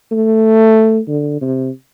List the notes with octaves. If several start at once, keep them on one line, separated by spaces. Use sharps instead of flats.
A3
D3
C3